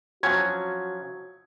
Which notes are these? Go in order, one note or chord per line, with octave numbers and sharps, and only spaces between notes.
F3 F#3 C#4 F#4 G#6